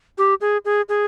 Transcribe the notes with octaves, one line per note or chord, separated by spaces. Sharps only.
G4
G#4
G#4
G#4